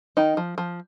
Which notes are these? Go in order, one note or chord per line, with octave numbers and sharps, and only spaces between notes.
D#3 D#4
F3
F3